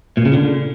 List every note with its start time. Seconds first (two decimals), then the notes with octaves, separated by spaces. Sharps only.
0.17 A#2
0.25 C#3
0.33 D3